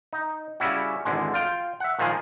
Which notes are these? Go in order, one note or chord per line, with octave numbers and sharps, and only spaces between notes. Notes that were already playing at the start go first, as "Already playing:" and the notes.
D#4
C#3 G3 C#4 E4 F#4
G#1 E2 D3 G#3
F4 F5 G5
E5 F#5
A#2 D#3 F3 G#3 G#4